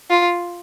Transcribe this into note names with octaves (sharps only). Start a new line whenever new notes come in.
F4